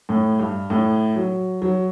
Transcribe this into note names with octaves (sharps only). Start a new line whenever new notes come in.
A2
G2
A2
F#3
F#3